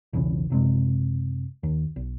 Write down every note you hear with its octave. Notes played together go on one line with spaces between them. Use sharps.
B1 E2 C#3
F#1 C3 G#3
D#2
B1